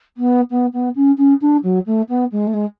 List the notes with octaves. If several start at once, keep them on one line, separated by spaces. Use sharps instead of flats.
B3
B3
B3
C#4
C#4
D4
F#3
A3
B3
G#3
A3
G#3